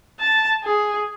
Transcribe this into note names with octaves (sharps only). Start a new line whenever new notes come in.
A5
G#4